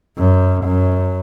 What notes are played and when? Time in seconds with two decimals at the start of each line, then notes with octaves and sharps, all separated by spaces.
0.18 F#2
0.65 F#2